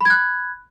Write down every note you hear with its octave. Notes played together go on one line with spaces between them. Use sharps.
B5 F#6 G#6